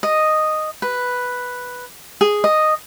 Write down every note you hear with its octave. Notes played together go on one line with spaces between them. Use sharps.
D#5
B4
G#4
D#5